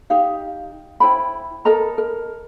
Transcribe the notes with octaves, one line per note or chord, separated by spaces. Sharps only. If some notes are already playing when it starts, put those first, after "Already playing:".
D#4 G4 F5
E4 C5 G5 B5
A4 A#4 D#5 A#5
A#4